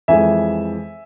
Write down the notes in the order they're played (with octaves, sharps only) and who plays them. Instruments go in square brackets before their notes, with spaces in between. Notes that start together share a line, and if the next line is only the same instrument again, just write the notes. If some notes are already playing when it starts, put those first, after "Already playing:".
[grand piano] F2 E3 G#3 E5 G#5